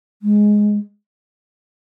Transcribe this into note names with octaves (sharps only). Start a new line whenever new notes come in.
G#3